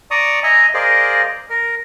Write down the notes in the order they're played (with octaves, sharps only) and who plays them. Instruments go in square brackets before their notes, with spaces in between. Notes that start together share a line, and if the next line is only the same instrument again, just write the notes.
[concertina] D5 A#5 C#6 D#6
D#5 E5 G#5 A#5
G#4 A#4 C5 D5 D#5 F5
A#4